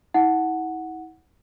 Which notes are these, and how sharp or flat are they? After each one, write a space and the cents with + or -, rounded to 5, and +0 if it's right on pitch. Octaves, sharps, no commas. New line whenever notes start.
E4 -40 F#5 +0